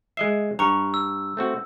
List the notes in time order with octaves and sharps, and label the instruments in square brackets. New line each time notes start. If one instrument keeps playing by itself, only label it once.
[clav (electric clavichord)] G#3 D#5 E5 [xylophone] C7
[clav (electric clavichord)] G2 [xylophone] A#5 C#6 C#7
[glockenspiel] E6
[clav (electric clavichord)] A3 C4 F#4